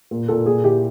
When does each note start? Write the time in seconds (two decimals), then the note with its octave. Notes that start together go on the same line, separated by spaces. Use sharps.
0.11 A#2
0.28 A#2 A4
0.46 A#2 G#4
0.64 E4 G4